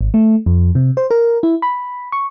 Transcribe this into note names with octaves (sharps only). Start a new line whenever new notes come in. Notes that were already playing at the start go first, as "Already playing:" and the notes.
G#1
A3
F2
C3
C5
A#4
E4
B5
C#6